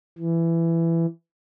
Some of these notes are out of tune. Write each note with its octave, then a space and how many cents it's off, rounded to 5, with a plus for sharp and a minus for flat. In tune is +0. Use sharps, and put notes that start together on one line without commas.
E3 +15